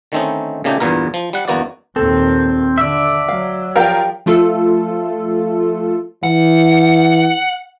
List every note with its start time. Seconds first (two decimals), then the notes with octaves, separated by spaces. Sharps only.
0.12 D3 D#3 A3 C4 C#4 D#4
0.64 A#2 C#3 A3 D#4 G4
0.80 E2 G2 A#2 B3 A#4
1.14 F3
1.33 G3 F#5
1.48 G1 E2 A#3 B3 F#4 D5
1.96 D#2 A#2 C4 A4
2.78 D3 D5 E5
3.28 F#3 F5
3.76 F3 F4 G4 A#4 D5 G5
4.26 F3 A3 F4 A4
6.23 E3 F#5